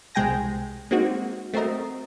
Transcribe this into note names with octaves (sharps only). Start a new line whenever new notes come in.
C2 B2 G#3 G5 G#5 A#6
G#3 A#3 C4 D#4 F#4
A3 C4 F#4 A#4 D#5